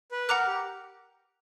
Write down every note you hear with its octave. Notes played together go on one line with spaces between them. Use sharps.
B4
A#4 F#5 A#5 D6 F#6
G4